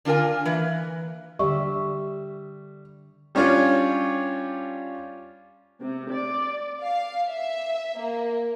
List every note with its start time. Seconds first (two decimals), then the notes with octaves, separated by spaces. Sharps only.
0.05 D3 D4 F4 A#4 G#5
0.45 E3 A#3 B4
1.39 D3 G3 E5 C#6
3.35 G3 C#4 D4 F4 C#5
5.81 C3
6.12 D5
6.82 F5
7.29 E5
7.99 A#3